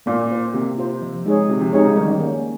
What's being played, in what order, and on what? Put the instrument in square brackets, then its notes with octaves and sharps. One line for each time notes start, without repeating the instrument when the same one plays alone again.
[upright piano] A#2 [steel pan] A#3
[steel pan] F4 C5
[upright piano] C3 [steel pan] A#3
[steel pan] F4 C5
F3
G#3 D#4 G#4 C#5
[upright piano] C3 [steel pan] F3
[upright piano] C3
[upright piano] C3 [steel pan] G#3 D#4 G#4 C#5
[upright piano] C#3
[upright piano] D#3 [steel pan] G3
[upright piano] D#3
[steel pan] A#3 C#4